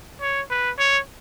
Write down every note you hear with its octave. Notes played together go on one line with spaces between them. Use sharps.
C#5
B4
C#5